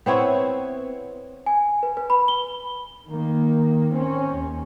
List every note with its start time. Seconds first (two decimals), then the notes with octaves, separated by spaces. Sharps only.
0.06 B3 C4 E4 C#5
1.46 G#5
1.83 B4
1.97 B4
2.10 B5
2.28 G7
3.09 D#3 A#3
3.91 C4 C#4
4.32 D#2